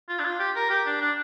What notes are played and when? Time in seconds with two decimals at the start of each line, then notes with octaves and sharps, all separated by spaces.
0.09 F4
0.19 D4
0.25 F4
0.40 G4
0.56 A#4
0.70 G4
0.86 D4
1.01 D4